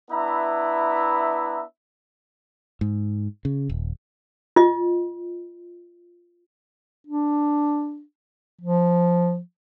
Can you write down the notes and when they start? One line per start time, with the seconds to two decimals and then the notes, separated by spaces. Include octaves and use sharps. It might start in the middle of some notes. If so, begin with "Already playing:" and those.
0.10 B3 D4 E4 B4 E5 A#5
2.81 G#2
3.45 C#3
3.69 D#1
4.56 F4 D#5
7.07 D4
8.61 F3